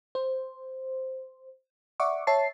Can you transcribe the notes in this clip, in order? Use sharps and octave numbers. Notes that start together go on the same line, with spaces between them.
C5
D5 E5 F#5 C#6 D6
C#5 E5 A5 C7